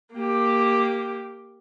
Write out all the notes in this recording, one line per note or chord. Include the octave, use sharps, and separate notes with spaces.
A#3 G4